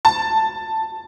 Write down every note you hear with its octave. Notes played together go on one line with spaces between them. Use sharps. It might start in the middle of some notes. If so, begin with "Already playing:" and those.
A5